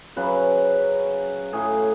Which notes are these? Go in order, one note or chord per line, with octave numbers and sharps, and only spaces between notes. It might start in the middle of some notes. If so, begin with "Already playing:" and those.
F#2 C#3 F#3 B4
A2 F#3 G#4